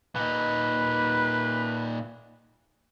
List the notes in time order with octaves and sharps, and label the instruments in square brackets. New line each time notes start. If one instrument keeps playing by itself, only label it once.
[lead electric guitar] A#2 D#4 [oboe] B4